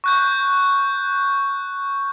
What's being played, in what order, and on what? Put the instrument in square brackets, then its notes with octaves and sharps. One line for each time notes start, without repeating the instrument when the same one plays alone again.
[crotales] C#6 F#6 G6